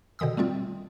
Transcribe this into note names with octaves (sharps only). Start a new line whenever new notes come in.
B2 D3 D#3 D#6 E6
G3 A3 C4 F4